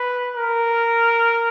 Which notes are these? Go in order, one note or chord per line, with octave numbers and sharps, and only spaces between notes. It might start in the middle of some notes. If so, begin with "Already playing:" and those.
Already playing: B4
A#4